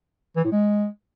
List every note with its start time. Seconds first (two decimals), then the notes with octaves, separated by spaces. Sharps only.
0.36 E3
0.44 A2
0.52 G#3